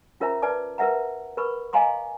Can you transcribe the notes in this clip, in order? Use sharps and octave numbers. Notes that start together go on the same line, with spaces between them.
C#4 F4 A#4 C5 E5 A#5
B4 D5 A5 D6
A#4 B4 E5 F#5 A#5
A#4 B4 B5 C#6
D#5 F5 G#5 A#5 C6 D6